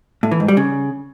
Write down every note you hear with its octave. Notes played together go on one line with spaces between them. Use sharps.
A2
E3
G#2
G3
C#3